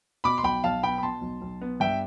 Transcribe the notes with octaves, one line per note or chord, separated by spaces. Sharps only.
B2 B5 D6
C6
B1 G5 B5
B1 F5 A5
B3 G5 B5
B5
B2 A5 C6
B1
B1
B3
G2 E5 G5